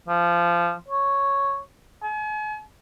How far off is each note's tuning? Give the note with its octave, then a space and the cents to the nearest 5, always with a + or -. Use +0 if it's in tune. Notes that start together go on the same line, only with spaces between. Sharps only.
F3 -20
C#5 +0
G#5 +40